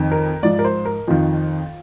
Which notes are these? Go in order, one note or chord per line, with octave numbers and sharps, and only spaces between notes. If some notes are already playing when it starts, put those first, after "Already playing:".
Already playing: F2 D#3
A#4
G#2 F3 D5
A#4
C5
A#4
F2 D#3 F4